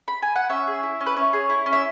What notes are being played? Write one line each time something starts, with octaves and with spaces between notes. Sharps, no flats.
B5
G#5
F#5
C#4 E5
G#4
E4
C#4
B4
C#4 C#5
G#4
E4
C#4
E5